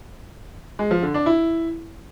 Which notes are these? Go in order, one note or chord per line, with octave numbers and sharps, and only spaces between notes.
G#3
F3
D3
D4
E4